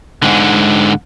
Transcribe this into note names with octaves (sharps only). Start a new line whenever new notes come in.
G#2 D3